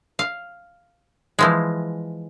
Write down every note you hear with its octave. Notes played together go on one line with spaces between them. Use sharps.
F5
E3 F3 G#3